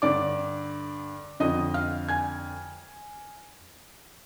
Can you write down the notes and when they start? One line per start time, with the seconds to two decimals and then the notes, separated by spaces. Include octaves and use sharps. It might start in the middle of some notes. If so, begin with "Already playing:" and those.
0.02 G2 D3 D5 D6
1.40 F2 D3 D#5 D#6
1.74 F5 F6
2.09 G#5 G#6